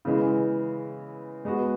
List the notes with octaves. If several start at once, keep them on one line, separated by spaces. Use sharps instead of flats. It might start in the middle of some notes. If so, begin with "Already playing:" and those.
C#3 E3 G#3
G#3 B3 F#4